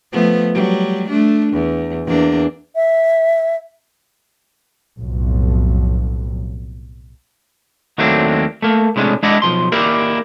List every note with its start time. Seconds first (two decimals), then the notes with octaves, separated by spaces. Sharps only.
0.12 F3 A3 B3
0.53 F#3 G3
1.09 A3 D4
1.53 E2
2.06 E2 A#3 D4
2.75 E5
4.98 B1 F2 A2
7.98 D#2 F#3 A3 A#3 C4 D4
8.62 A3 A#3
8.96 A2 C3 G#3 C#4 D4
9.23 G#3 D4 E4 D5 D#5 F#5
9.42 B1 G#2 F3 C6
9.72 A#3 E4 G4 A#4 D5